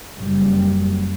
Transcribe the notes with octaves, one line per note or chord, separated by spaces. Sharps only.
F#1 F#2 G3